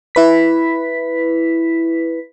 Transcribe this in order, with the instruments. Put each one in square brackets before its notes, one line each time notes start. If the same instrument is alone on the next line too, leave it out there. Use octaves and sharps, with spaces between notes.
[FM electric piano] E4 B4 B6